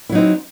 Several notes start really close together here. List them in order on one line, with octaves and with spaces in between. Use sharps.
E4 F#3 D#4 C4